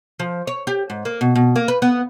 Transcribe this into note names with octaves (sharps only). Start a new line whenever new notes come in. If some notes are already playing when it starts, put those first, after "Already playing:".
F3
C#5
G4
G#2
A#3
B2
B2
A#3
B4
B3